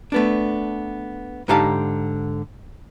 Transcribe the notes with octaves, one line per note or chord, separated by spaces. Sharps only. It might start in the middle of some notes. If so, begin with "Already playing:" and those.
A3 B3 D4
G#2 D3 D#4 G4 F5 A5